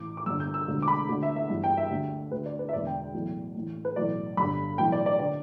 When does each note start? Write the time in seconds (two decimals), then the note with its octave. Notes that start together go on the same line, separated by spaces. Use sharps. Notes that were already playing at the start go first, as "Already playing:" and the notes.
Already playing: A1 A2 E3 D6
0.17 D6
0.26 G1 G2 D3 E6
0.40 G6
0.54 E6
0.67 E1 D2 D3
0.82 D6
0.88 B5
1.09 D2 D3
1.23 E5
1.36 E5
1.50 G1 G2 E3
1.64 G5
1.77 E5
1.90 D2 D3
2.31 D2 D3 B4
2.46 D5
2.59 B4
2.69 E5
2.73 E1 E2 D3 D5
2.87 G5
3.14 B1 A2 E3
3.55 A1 A2 E3
3.85 B4
3.96 B1 A2 E3 D5
4.37 G1 G2 D3 B5
4.78 B1 A2 E3 G5
4.92 D5
5.06 D5
5.19 D3 D5